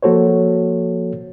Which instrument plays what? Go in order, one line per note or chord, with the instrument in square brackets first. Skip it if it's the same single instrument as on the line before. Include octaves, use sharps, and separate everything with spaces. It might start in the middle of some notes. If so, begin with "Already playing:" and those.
[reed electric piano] F3 A#3 F#4 A4 C5 C#5